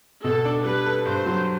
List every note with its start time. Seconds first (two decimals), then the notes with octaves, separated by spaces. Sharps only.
0.24 B2 A4
0.45 D4
0.65 G3 B4
0.86 A4
1.05 G2 C5
1.26 F#3